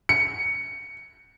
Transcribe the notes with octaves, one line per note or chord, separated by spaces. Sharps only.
C#7